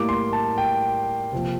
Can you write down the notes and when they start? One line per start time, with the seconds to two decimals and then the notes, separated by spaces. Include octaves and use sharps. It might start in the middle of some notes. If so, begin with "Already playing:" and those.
Already playing: A2 G3 A#3 D6
0.09 C6
0.33 A5
0.58 G5
1.32 C3 F3 A#3